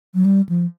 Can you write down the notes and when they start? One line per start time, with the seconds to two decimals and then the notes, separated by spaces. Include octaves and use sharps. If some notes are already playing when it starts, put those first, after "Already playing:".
0.15 F#3
0.25 G3
0.49 F3